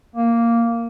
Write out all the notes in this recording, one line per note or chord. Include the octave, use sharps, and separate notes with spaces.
A#3